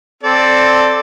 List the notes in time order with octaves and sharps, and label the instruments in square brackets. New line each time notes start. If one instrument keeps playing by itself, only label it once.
[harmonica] C4 A4 D5